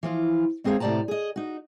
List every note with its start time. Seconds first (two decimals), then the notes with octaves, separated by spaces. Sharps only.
0.03 E3 F3 F4
0.64 G#3 C4 G#4 C5 C#5 F5
0.80 A2 C3 G4 D5 A5 A#5
1.08 G#4 D#5
1.36 D#4 F#4